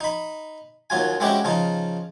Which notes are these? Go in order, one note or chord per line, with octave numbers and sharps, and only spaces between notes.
D#4 B5
D#2 F#3 F4 G#5
G#3 C4 C#4 E4 F#4 G4
C#3 F3 D#4 F4